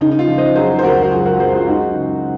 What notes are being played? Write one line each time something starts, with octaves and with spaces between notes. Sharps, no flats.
C#3 D#4
D#4
F4
F3
C5 D#5
F#3 G#4 C5
C5
C#2 F#4 A#4
F#4
F#2 F4 G#4
F#4 A#4
F#2 G#4 C5
F4 G#4
G#3 D#4 F#4
C#3